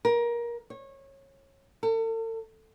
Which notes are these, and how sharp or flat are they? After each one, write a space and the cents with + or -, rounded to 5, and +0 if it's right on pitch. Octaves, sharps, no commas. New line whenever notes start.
A#4 +20
C#5 -25
A4 +40